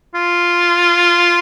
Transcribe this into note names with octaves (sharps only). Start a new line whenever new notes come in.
F4